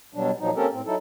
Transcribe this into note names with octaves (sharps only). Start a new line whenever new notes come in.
B2 F#3 G3 D4
A#2 F3 F#3 D#4
A#3 C4 C#4 G4 A4 A#4
A2 C4
F#3 D#4 E4 A4